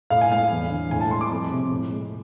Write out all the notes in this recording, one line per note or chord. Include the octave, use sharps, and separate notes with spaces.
A2 F5
G#5
G#3 F5
E2
D3
A2 G#5
A5
G#3 C6
D6
F2
C3
A2
G#3